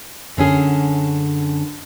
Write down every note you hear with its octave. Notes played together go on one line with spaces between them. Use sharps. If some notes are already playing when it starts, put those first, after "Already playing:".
F#2 D3 C#4 G#4